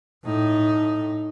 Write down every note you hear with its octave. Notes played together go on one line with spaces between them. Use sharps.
A2 D#4